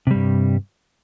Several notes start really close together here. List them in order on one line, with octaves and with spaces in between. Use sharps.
C3 G3 G2